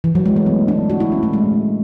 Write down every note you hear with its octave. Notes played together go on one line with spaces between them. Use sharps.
E3
F#3
G#3
A3
B3
D4
F#4
E4
C#4
A3
G#3